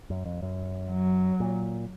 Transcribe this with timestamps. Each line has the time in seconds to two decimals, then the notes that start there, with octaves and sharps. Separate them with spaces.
0.10 F#2
0.25 F2
0.42 F#2
0.91 F#3
1.40 A#2